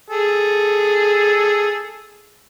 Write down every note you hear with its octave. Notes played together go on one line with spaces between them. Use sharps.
G#4 A4